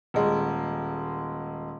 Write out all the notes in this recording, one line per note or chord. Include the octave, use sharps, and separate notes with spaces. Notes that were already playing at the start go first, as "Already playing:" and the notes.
D#1 G#3